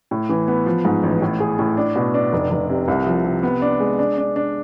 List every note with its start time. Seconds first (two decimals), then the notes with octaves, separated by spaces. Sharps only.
0.11 A2
0.29 E3
0.48 B3
0.66 F3
0.85 G#2
1.03 A1
1.22 A2
1.40 G#4
1.59 A2
1.77 D4
1.95 B2
2.14 D4
2.33 F1
2.51 F1
2.69 C3
2.88 C2
3.07 F3
3.25 C3
3.43 B3
3.62 D4
3.80 G#3
3.99 D4
4.18 D4
4.36 D4